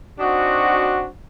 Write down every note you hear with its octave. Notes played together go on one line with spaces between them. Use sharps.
C4 D4 D#4 F#4